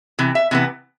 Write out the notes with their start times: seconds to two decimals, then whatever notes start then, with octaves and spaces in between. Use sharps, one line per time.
0.19 C3 E3
0.35 E5
0.51 C3 E3 B3